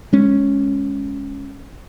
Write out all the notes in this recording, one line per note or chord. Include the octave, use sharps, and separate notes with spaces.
G#3 C#4